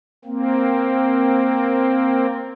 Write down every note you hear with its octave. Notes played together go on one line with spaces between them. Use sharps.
A#3 C4